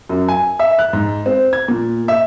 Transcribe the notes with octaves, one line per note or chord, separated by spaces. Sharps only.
F#2
G#5
E5
F#6
G#2
C4
G#6
A#2
E5